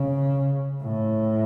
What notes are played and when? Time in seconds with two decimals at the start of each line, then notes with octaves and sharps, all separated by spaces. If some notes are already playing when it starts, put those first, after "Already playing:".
Already playing: C#3
0.83 A2